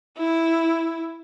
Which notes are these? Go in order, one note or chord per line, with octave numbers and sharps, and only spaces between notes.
E4